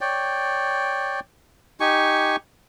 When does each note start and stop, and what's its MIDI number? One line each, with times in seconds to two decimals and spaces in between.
0.01 1.20 73
0.01 1.20 74
0.01 1.20 79
1.80 2.36 63
1.80 2.36 67
1.80 2.36 80
1.80 2.36 85